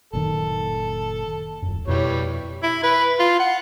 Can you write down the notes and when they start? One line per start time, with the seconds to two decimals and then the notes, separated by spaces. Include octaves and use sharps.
0.13 F#1 A#2 D#3 A4
1.62 D#1 F#2
1.87 F2 B2 E3 G3 C#5
2.63 E4
2.83 B4
3.19 F4
3.40 F#5